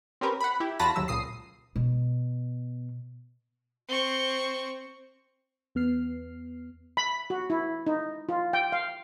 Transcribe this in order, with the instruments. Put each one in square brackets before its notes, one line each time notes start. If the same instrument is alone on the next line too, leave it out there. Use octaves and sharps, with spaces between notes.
[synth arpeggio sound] C4 C#4 G4 A#4 B4
F#5 B5
E4 G4
E2 F4 F#4 A5 B5 A#6
G1 D#2 F#3 E6
C#2 A#2 D#6 C7
[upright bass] B2
[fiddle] C4 C#6
[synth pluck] E2 B3 F6 C7
[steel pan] B5
F#4
E4
D#4
F4
G5
F5